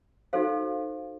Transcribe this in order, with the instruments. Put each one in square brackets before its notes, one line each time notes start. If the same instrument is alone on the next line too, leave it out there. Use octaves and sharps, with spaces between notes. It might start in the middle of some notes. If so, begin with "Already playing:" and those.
[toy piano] D#4 F#4 A4 C5 F5